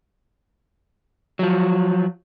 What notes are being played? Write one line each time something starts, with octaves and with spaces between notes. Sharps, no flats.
F3 F#3